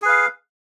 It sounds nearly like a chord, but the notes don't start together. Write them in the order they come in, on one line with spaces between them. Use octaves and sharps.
G#4 B4 F5